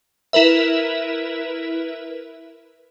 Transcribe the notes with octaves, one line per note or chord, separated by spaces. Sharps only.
E4 A#4 B4 E5